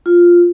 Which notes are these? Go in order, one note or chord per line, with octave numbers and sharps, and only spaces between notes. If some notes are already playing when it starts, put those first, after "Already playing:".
F4